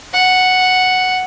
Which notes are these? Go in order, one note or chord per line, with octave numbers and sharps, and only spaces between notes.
F#5